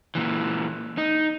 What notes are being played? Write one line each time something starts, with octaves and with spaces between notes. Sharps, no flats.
A#2 E3
D#4